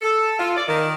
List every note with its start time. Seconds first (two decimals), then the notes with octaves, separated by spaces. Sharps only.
0.02 A4
0.39 F4
0.55 D5
0.67 D#3